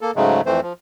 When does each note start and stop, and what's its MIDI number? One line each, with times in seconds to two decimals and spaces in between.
0.01 0.11 58
0.01 0.11 69
0.16 0.41 44
0.16 0.41 49
0.16 0.41 54
0.16 0.41 56
0.16 0.41 57
0.46 0.60 41
0.46 0.60 52
0.46 0.60 57
0.46 0.60 60
0.46 0.60 72
0.62 0.73 53